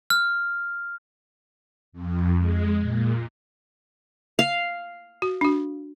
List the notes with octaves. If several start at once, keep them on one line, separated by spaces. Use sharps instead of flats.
F6
F2
G#3
A#2
F5
F#4
D4 F#4